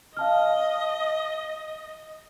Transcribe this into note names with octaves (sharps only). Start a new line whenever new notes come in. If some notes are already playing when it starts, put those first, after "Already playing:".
D#5 F5 A5 F6